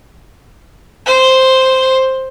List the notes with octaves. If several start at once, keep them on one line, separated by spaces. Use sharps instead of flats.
C5